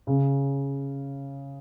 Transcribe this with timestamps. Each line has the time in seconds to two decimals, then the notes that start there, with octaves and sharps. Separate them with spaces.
0.07 C#3